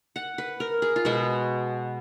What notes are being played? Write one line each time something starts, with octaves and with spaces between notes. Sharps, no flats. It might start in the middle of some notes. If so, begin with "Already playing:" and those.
F#5
B4
A#4
G#4
F4
B2 G#3 B3 F#4